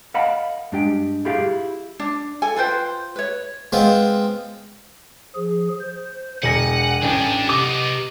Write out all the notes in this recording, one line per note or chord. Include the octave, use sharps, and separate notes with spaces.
A#4 D#5 F5 F#5 A5 B5
G2 G#3 D4 G4 G5
E4 F4 G4 G#4 E5 F5
D4
A4 G#5
F4 B4 C5 G5
B4 C#5
G#3 B3 C4 F4
F3 G#4
C5
E1 F#5 G#5 A#6 C#7
A1 G2 D4 G5
C3 B3 D#4 D6